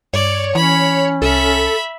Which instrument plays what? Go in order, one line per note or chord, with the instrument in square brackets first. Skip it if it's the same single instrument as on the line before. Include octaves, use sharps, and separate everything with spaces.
[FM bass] G2 [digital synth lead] C#5 [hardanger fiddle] D5
[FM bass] E3 [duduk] C#4 [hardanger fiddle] B5
[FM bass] C2 [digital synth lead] A4 [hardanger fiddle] E5 B5